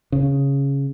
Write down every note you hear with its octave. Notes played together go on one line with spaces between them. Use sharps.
C#3